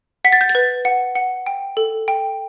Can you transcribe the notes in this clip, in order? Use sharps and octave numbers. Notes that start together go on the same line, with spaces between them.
F#5 B6
A6
G6
A6
B4
F#5
F#5
G5
A4
G5